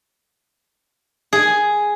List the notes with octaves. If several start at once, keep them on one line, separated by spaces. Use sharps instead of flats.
G#4